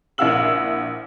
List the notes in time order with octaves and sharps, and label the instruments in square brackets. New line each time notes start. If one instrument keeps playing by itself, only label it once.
[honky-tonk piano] A#1 E4 F5 F#5 E6 F#7